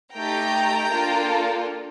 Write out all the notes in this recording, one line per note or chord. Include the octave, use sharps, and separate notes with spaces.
A3 D#4 G4 G5 A#5
A#3 D4 F4 A4